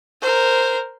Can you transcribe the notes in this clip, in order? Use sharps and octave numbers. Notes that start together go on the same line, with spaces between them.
A#4 C5